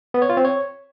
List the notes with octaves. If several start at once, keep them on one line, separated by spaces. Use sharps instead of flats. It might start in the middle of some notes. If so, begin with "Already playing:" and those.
B3
C#5
F4
C4
C#5